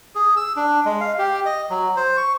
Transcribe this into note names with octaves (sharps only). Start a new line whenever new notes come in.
G#4
E6
D4
G#3
F5
G4
D#5
F#3
C5
C#6